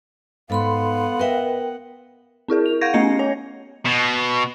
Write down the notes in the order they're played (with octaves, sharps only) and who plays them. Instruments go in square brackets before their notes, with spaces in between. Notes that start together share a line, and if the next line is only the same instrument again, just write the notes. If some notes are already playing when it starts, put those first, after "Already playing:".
[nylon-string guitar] G#2 [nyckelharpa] B3 F#5 [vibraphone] A4 B5 C6 [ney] F5
[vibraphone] A#4 G5 [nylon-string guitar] B4 D#5 E5
[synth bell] C4 E4 G#4 A#4
F7
F5 F#5 C#6 G6 G#6 A#6
A3 B3 C#4 D#5 G#6 C#7
C#5 G#5
[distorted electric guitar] B2